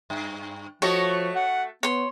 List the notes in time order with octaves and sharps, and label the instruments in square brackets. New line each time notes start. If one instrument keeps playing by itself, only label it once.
[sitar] G2
[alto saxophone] F3 [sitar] A3 F#4 A4 [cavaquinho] C#5 D#5
[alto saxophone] F#5
[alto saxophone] B3 [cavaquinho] C#5 C6